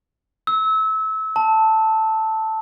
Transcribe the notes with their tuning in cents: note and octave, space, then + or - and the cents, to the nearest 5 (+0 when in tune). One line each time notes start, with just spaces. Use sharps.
E6 -25
A5 +5